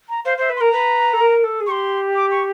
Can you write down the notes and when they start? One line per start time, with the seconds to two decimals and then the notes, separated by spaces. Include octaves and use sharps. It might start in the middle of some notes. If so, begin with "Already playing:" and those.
0.09 A#5
0.24 C5 F5
0.37 C5 E5
0.49 B4
0.56 C6
0.60 A#4 A#5
0.72 B4
1.13 A4
1.20 A#4
1.43 A4
1.60 G#4
1.67 G4 C6 C#6
2.15 D6
2.31 C#6